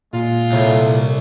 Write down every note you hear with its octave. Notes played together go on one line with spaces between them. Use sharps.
A#2 G#3 F4
C2 A2